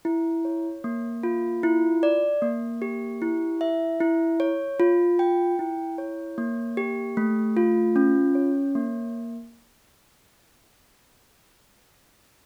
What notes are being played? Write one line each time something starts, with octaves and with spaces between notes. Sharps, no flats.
E4
C#5
A#3
F4
E4
D5
A#3
G4
E4
E5
E4
C#5
F4
G5
E4
C#5
A#3
G4
A3
F4
C#4
C#5
A#3